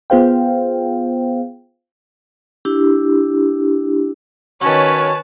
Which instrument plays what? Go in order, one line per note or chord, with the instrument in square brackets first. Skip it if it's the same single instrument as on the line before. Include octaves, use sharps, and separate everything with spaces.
[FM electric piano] B3 F4 G#4 C5 F5 G5
[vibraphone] D4 E4 G4
[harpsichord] D#3 F#3 [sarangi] C#4 [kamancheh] B4 A5 [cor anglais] C#5